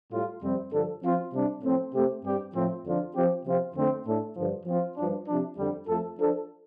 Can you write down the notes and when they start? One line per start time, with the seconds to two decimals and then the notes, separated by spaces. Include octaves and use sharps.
0.10 A2 G3 F4 A4
0.42 F2 C3 G3 C4
0.71 G2 D3 F3 D4 A4
1.02 F3 C4 F4
1.32 C3 G3 D4
1.62 A2 F3 C4 A4
1.93 C3 A3 C4 G4
2.23 G2 G3 C4 G4
2.54 A2 F3 A3 C4
2.83 F2 D3 F3 D4 F4
3.14 F3 C4 G4
3.45 C3 F3 C4 F4
3.74 F2 D3 A3 C4
4.06 A2 A3 D4 A4
4.35 G2 D3 F3
4.66 F3 C4 F4
4.96 G2 F3 D4
5.27 C3 F3 D4
5.57 F2 D3 G3
5.87 F2 F3 A3 F4 A4
6.18 F3 D4 A4